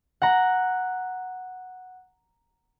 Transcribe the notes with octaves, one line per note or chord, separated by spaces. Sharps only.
F#5 A#5